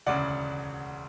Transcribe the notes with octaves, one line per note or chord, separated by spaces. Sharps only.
E1 D2 C#3 D5 F#5